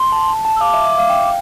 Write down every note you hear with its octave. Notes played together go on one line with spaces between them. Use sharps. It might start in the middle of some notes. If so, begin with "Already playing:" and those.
Already playing: C6
A5
A5
A5
E6
F5 D6
E5
E5
F5
G5